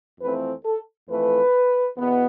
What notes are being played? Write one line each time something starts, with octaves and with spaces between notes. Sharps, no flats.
F2 E3 A3 C4 B4
A4
F2 E3 A3 B4
E2 B2 B3